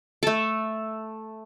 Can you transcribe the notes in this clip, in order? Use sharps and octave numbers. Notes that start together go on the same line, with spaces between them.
A3 A4